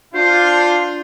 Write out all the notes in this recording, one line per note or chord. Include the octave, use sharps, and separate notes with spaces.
D4 F4 C5